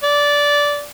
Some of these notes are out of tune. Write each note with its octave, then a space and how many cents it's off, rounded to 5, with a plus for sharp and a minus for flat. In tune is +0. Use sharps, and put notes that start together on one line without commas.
D5 -15